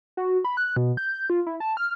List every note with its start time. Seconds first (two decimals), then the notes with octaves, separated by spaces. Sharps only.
0.17 F#4
0.45 B5
0.57 F#6
0.76 B2
0.97 G6
1.30 F4
1.47 E4
1.60 A5
1.77 F6